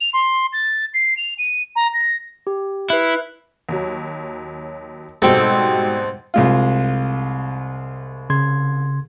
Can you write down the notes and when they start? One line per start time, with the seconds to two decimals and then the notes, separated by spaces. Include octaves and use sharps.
0.01 F7
0.14 C6
0.53 A6
0.94 C7
1.17 F7
1.38 D#7
1.76 A#5
1.93 A#6
2.47 G4
2.90 E4 B4 F#6
3.69 D#2 F#3
5.22 G#2 B2 G3 C4 A4
6.34 C2 G#3 F4
8.30 C#3 C6 G#6